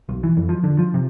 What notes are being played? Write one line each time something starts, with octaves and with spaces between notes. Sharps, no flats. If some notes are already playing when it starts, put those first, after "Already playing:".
B1
E3
F2
F3
D3
F3
C3